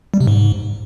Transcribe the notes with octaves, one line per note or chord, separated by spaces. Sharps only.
G3
C3
G#2